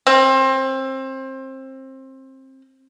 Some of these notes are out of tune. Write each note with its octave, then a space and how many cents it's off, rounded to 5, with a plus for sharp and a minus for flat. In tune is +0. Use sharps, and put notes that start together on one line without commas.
C4 +25